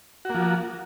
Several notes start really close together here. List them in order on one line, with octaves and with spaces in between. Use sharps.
F#4 A#3 F3